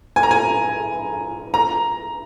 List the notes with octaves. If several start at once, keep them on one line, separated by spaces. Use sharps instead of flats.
G#5
A#5
G#5
A#5